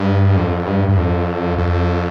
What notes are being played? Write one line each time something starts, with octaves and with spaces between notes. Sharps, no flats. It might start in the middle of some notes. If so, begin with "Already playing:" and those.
Already playing: G2
F2
G2
G2
F2
F2